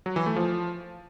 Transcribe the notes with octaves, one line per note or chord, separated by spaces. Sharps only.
F#3
E3
A3
F3